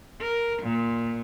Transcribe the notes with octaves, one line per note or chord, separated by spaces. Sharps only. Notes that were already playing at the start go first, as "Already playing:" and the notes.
A#4
A#2